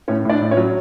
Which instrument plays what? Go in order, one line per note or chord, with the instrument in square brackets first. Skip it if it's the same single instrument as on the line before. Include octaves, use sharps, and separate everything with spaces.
[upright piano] A2 C#4 C#5
A2 D4 D5
A2
C#4 C#5
F#3